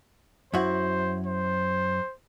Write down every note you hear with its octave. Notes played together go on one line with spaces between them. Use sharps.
F#2 E4 F#4 C5
C5